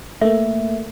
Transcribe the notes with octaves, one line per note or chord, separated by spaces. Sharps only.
A3 A#3 E5